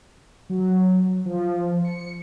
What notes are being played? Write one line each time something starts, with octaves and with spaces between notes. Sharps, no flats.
F#3
F3
C#7